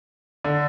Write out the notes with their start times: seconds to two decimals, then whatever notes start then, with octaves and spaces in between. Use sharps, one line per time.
0.44 D3